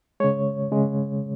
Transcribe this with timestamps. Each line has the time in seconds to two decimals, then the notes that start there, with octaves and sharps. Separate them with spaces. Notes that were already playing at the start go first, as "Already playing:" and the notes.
0.20 C#3 G#3 C#5
0.71 C#3 G#3